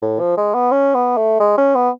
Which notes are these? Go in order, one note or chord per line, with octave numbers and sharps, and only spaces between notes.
A2
F3
G#3
B3
C#4
B3
A3
G#3
C#4
B3